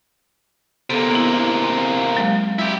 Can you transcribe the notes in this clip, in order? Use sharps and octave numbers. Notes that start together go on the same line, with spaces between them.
C3 A#3 B3 A4
B3 E4
C4
F#3 G#3
E4 G4